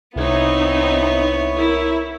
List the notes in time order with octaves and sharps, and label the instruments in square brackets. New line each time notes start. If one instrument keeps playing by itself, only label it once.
[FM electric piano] C2 G#6 [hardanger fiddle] B3 C#5 [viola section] C4 D#4 [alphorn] E4
[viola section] E4 [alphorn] A#4